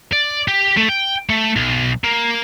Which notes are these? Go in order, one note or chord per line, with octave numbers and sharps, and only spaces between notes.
D5
G4
A3
G5
A3
B1
A#3